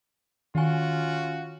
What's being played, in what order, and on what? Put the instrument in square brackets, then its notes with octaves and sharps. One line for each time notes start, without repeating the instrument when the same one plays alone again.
[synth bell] D#3 G#5 [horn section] C#4 F4 F#4